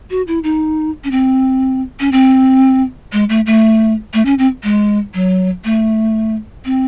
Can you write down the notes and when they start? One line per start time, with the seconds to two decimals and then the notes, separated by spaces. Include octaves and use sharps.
0.10 F#4
0.28 E4
0.43 D#4
1.04 C#4
1.11 C4
2.00 C#4
2.12 C4
3.12 G#3
3.29 A3
3.46 A3
4.14 A3
4.25 C#4
4.38 C4
4.63 G#3
5.14 F#3
5.65 A3
6.65 C4